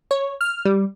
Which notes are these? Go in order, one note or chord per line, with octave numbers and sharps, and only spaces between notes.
C#5
F6
G3